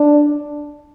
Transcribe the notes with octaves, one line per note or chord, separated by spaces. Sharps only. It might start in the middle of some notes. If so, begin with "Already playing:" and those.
Already playing: D4